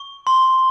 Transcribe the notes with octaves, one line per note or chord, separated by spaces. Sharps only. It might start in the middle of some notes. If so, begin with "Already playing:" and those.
Already playing: C#6
C6